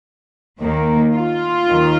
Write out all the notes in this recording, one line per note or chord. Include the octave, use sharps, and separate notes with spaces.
D#2 D#3 A#3
F4
D#2 D#3